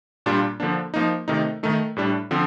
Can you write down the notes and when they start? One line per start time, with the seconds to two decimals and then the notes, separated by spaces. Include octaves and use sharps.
0.26 A#2 G3 D4 F4
0.60 D3 F3 A#3 D4
0.94 F3 A#3 D#4
1.28 C3 D#3 A3 D#4
1.63 D#3 A3 D#4
1.97 A2 G3 D4
2.31 D3 F3 C4